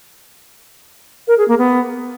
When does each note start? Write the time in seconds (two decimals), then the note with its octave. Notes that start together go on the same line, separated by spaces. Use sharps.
1.28 A#4
1.38 G#4
1.48 A#3
1.58 B3